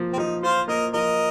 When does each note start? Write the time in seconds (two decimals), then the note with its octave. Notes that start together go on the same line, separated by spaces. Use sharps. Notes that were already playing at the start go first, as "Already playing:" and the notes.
Already playing: F3 A#3
0.13 C4
0.18 F3 D#4
0.43 F4 C5 F5
0.68 A#3 A#4 D#5
0.94 F3 A#4 D#5